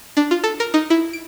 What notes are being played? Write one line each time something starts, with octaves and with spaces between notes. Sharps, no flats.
D4
F4
A4
A#4
D#4
E4
D7